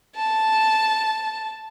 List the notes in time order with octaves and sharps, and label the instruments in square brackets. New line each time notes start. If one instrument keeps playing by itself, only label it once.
[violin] A5